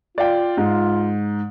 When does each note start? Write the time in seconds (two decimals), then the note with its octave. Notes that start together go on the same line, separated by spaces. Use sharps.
0.18 F4 D5 F5 G5
0.57 G#2